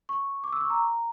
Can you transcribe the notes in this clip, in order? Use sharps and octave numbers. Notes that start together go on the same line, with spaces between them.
C#6
D6
E6
C#6
A#5